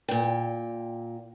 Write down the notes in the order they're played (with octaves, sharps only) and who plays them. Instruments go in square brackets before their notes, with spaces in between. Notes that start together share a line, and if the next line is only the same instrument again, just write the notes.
[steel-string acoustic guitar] A#2 G5